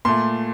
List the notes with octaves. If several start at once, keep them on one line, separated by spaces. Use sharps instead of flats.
A#2 A3 C6